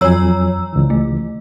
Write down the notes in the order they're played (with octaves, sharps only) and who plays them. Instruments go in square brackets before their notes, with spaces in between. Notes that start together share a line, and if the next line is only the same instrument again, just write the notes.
[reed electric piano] F2 F#3 G#5 [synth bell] C#5 A#5 E6
[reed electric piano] C#2 E3
[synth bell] A3